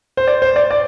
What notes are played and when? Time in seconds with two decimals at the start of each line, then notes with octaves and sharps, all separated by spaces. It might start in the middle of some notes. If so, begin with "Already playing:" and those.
0.17 C5
0.27 D5
0.42 C5
0.56 D5
0.71 D5